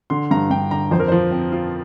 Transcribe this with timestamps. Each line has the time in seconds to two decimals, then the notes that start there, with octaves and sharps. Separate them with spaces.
0.10 D3 C6
0.31 G2 A#5
0.50 G2 G5
0.71 D3 A#5
0.91 F2 C5
1.00 A#4
1.08 F3 C5
1.32 C4
1.52 F4